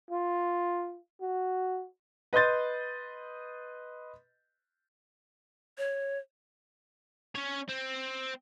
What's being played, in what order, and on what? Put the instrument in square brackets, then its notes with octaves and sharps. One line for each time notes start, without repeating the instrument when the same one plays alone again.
[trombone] F4
F#4
[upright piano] B4 D#5 C6 G6 A6
[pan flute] C#5
[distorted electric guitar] C#4 C#5
C4